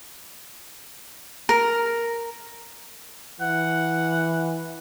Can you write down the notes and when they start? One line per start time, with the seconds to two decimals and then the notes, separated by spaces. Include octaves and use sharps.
1.49 A#4
3.41 E3 F#5